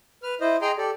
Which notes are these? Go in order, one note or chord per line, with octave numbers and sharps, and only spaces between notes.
B4 F6
E4 C5 D#5
G#4 D#5 G5 A#5 C6
G4 A4 D5